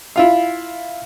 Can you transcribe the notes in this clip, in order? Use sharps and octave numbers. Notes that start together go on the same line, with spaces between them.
E4 F4 F5